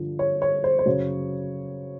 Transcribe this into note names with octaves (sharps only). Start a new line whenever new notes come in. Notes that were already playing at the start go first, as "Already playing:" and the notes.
Already playing: G2 D3 F3
C#5
C#5
C5
C5
F#2 C#3 F#3 C#5